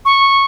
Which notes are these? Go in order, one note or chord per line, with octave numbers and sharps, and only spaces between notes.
C#6